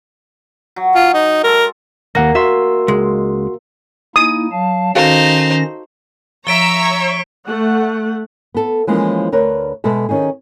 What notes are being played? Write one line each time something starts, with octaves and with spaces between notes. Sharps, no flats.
F#3
F4 G#5
D#4
G#3 A4 A#4
D#2 A#3 F#5 A#6
F#4 E5 C6
C#2 G#3
A#3 D#4 E4 D#6
F#3 F5 A5
D#3 C#4 D#4 F#4 A4 C5 F5 A#6
F3 C#5 E5 A#5 E6 B6 D7 G7
A3 F#5
B3 A4
E3 F3 G#3 A#3 C#4
D2 A#4 B4 C#5
B2 G#3 A4 E5
D#3 C#4 D#4 G#4